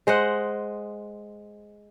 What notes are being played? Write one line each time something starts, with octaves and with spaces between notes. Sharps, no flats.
G#3 C5 D#5 F#5